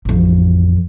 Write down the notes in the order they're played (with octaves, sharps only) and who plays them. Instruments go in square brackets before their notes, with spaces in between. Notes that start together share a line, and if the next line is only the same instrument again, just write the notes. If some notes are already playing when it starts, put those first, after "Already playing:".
[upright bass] A1 F2